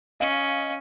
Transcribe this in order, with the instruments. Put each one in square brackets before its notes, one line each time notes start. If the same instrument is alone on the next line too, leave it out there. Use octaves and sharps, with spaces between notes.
[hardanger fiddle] C#4 [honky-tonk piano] D#5 F5